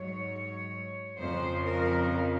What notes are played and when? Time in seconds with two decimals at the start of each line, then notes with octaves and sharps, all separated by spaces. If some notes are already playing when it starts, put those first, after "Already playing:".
Already playing: G#2 F#3 C#5
1.18 F2 C#3 F3 C5
1.66 A#4